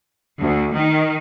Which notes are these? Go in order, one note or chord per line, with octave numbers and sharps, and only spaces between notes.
D2
D#3